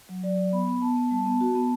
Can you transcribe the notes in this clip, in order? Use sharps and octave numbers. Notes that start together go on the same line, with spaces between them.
F#3
F#3 D5
F#3
B3 B5
B3
B3 A5
B3
G3 A5
B3
F#4
B3